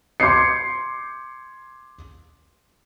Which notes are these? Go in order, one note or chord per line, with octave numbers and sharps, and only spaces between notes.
C6 D6 G6 G#6 C7 C#7